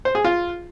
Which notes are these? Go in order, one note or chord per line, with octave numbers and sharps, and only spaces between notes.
C5
G#4
F4